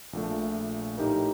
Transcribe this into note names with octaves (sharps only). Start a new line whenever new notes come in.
A#1 A#2 A3
A2 A3 D#4 G4 A#4